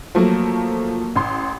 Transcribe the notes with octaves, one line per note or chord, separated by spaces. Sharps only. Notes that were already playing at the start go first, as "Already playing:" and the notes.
F3 F#3 A3 A#3
A1 C6